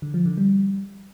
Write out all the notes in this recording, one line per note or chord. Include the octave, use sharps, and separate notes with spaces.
D3
F3
D3
G3